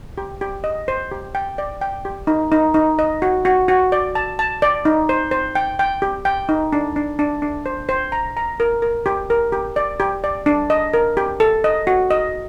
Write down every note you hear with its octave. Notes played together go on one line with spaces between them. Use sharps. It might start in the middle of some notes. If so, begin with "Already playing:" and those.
G4
G4
D#5
C5
G4
G5
D5
G5
G4
D#4
D#4
D#4
D#5
F#4
F#4
F#4
D5
A5
A5
D5
D#4
C5
C5
G5
G5
G4
G5
D#4
D4
D4
D4
D4
C5
C5
A#5
A#5
A#4
A#4
G4
A#4
G4
D5
G4
D5
D4
D#5
A#4
G4
A4
D#5
F#4
D#5